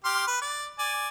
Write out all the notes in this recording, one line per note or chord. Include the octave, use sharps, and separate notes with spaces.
G4 C6 F6
B4
D5
D5 G#5